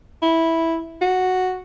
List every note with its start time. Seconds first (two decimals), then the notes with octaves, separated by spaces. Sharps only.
0.22 E4
1.02 F#4